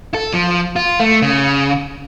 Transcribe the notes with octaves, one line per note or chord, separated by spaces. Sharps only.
A4
F3
F4
A3
C#3